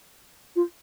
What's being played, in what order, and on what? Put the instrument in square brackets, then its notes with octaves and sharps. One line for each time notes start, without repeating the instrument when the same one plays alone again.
[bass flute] F4